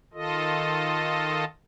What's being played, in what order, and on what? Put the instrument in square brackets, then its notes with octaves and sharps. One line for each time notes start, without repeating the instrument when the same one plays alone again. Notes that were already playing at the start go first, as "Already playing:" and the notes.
[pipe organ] D#3 F4 A4 D#5